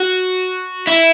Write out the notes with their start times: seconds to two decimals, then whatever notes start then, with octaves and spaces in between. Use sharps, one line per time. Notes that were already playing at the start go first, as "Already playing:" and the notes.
Already playing: F#4
0.87 E4